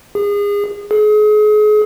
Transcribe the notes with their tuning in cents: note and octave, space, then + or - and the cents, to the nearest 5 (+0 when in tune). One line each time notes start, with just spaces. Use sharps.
G#4 -30
G#4 +35